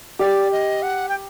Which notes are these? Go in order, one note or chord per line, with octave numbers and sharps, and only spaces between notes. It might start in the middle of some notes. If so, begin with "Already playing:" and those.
G4 D5
D#5
F#5
G5